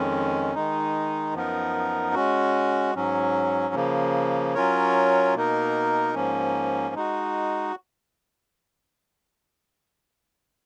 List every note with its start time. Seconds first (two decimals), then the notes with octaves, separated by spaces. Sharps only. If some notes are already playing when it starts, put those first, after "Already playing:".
Already playing: F2 D#3 G#3 C#4
0.54 D#3 G#3 D#4
1.34 F#2 F3 B3 D#4 A#4
2.14 G#3 C#4 F#4
2.95 G#2 F#3 C#4
3.75 C#3 F3 A#3
4.54 F#3 C#4 F4 A#4 C#5
5.34 B2 A#3 D#4 A#4
6.14 G#2 F3 A#3 C#4
6.95 G#3 D#4 F#4